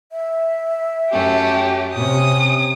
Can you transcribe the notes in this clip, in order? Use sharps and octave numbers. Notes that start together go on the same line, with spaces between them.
E5
F#2 A3 C#4 G4
C3 C#4 D#6